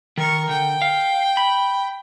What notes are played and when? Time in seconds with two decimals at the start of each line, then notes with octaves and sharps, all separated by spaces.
0.17 D#3 A#4 C#6
0.49 D3 G5
0.82 F5
1.37 B5